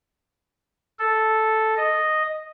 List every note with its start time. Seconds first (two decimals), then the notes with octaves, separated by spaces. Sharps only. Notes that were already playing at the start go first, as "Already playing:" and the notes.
0.99 A4
1.77 D#5